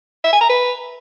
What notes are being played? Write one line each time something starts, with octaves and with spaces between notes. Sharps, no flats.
E5
G#5
A#5
B4